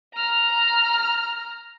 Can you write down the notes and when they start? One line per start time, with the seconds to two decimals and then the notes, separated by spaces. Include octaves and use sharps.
0.15 A#5 F6